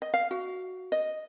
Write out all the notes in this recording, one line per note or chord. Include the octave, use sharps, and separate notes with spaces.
D#5
F5
F#4
D#5